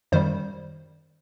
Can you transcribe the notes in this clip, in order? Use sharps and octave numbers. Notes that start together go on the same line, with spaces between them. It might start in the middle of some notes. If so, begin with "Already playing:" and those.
F#2 D#3 G3 C5